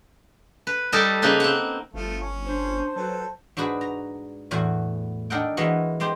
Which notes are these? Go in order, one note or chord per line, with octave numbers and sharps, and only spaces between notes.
B4
G3 D#4 A4 A#4 D#5
C#3 A#3 D#4 B4 C#5
C4 F#5
G1 F3 A3 F4
C#4
D4 C5
F#3 A4 B4
G#2 D4 F#4 G#4 B4
A#5
E2 A2 F#4 G#5
D4 D#4 A4 A#4 F#5 G5
E3 G#3 A#3 B3 F#4 D#5
G#3 C4 G4 C5